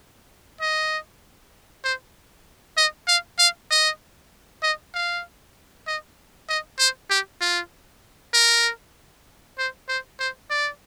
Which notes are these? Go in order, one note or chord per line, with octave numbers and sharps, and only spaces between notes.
D#5
C5
D#5
F5
F5
D#5
D#5
F5
D#5
D#5
C5
G4
F4
A#4
C5
C5
C5
D5